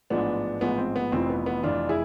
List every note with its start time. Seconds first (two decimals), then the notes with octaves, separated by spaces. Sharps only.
0.10 A1 G#2 F3 G#3 B3 D4
0.61 A1 G#2 F3 G#3 B3
0.78 C4
0.96 B3
1.12 F1 F2 E3 C4
1.29 B3
1.46 B3
1.63 F1 F2 E3 D4 F4
1.89 E4 G#4